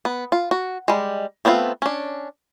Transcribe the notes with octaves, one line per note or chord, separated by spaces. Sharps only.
B3
F4
F#4
G3 G#3
A3 B3 C4 E4 F4
C#4 D4